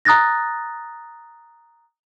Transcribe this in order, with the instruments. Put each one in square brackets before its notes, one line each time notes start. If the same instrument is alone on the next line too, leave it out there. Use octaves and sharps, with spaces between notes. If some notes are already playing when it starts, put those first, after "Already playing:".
[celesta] A#5 D#6 F#6 A6 A#6